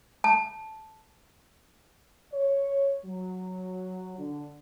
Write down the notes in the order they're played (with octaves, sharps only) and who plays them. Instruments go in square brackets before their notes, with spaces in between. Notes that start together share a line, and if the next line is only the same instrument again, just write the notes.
[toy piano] A5
[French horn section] C#5
F#3
D3